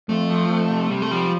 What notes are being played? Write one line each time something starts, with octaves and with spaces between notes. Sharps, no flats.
F2 A3
F3
F2
C3
C3 G3
A3
F3 G3